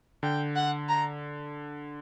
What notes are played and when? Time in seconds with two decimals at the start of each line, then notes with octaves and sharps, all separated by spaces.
0.23 D3 G5
0.56 F#5
0.89 A#5